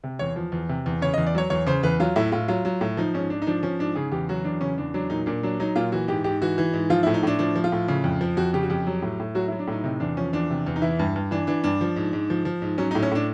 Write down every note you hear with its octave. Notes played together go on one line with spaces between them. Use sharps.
C3
E2 C#5
F3
E2
C3
E2
C#3 C#5
D#5
E2
D5
F#3 C#5
E2 C#5
C#3 C5
E2 B4
F#3 F4
A2 E4
A2 F4
F#3 F4
F#3
A2
F3 D#4
G#2 C#4
G#2 D4
D#4
F3 D4
F3 C#4
G#2 D4
C#3 G#4
E2 G4
F#3 F#4
E2 D4
C#3 C#4
E2 D4
F#3 D4
A#2 D#4
A#2 D4
F#3 D4
F#3 D#4
A#2 F4
E3 F#4
G#2 G4
G#2 G4
E3 F#4
E3
G#2
F3 F4
A2 E4
D#4
A2 D4
F3 D4
F3
F4
A2
C#3
F2
F3
F2 F#4
C#3 G4
F#4
F2 G4
F#3
A2
A2
F#3 F#4
E4
F#3
D4
A2 D#4
C3 D#4
E2 D4
F3 C#4
E2 D4
C3
E2
D#4
E3 E4
G2
G2
E3 D4
E3 D4
G2 D4
F3
G#2
G#2
F3
F3
G#2
F#3 C#4
D#4
A2
C#4
A2 D4